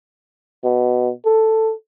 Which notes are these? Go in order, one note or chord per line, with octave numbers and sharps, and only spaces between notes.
B2
A4